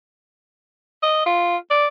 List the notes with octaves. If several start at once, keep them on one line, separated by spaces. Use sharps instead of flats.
D#5
F4
D5